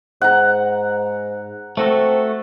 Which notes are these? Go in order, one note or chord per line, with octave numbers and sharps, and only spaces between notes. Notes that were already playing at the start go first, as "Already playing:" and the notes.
G#2 F#5 A#5
A3 C4 F#4 A4